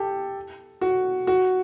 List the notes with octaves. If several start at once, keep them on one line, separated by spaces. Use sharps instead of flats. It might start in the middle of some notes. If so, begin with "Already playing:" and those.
Already playing: G4 A4
F#4
F#4